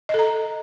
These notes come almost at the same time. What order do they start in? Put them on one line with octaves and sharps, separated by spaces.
D#5 A4 A#5